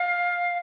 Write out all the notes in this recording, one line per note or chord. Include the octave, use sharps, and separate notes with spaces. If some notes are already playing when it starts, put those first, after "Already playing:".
Already playing: F5